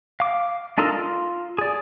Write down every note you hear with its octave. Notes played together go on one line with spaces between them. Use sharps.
F5 D6
D4 D#4 F4 A4 A#4
F4
G#4 D5